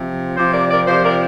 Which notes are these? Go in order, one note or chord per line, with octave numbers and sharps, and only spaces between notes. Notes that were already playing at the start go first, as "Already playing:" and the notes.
Already playing: C3 F3
C3 F3 G4 C5
A#4 D5
A#4 D5
C3 F3 G4 C5
A#4 D5